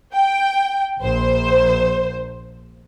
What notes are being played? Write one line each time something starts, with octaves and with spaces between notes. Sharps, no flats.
G5
A#1 C5